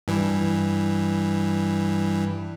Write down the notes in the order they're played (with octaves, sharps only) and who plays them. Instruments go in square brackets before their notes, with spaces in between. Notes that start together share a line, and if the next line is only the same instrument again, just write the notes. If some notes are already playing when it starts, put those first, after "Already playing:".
[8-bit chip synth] G2 E3